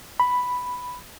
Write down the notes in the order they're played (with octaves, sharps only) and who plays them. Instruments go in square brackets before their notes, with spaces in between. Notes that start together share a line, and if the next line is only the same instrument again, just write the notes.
[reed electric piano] B5